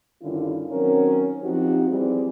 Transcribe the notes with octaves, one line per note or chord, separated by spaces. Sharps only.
G2 D3 D#3 C#4 E4 F4
D#3 F#3 C4 C#4 A#4
F2 F3 C4 D#4 F#4 G4
E3 G3 C4 D#4 E4 G#4